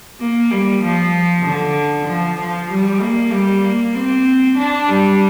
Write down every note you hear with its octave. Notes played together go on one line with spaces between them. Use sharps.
A#3
G3
F3
D3
F3
F3
G3
A#3
G3
A#3
C4
D4
G3